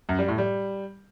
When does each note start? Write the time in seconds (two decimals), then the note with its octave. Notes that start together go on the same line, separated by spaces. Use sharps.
0.09 F#2
0.19 G3
0.28 A2
0.38 G3